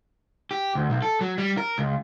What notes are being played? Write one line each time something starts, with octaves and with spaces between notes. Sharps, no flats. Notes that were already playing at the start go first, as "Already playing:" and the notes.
G4
D2
B1
A4
F#3
G3
A#4
C#2